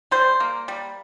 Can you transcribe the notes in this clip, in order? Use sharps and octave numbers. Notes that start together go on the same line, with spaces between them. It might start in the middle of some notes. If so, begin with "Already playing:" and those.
G3 C5
A#3
G3